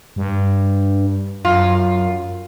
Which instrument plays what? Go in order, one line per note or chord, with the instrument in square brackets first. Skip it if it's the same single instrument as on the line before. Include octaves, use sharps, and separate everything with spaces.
[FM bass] G2
[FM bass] F#2 [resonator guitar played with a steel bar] F4